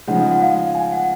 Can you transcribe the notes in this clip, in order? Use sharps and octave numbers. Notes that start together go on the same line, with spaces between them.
C#3 F3 G#3 D#4 F#5
F#5
F5
G#5
F#5